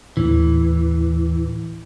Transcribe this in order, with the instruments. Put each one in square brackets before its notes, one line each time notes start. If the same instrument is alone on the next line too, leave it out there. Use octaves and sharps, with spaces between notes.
[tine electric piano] D#2 A2 [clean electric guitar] E3